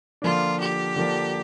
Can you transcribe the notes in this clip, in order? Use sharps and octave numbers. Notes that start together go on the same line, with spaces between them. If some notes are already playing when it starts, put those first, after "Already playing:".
D3 F3 A#3 D4 F4
G4
D3 F3 A#3 D4